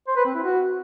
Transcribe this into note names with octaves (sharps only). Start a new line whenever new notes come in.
C5
B4
C4
E4
F#4